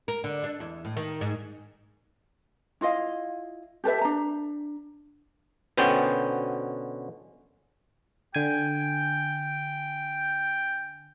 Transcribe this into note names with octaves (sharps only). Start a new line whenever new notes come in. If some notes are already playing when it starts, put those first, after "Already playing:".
A#4
D3
D4
E2
A2
D#3
G#2
E4 F4 D#5 F5
G4 A4 B4 E5
D4 A#5
B2 D3 B3 C#4 C5 G5
D3 G5 G#5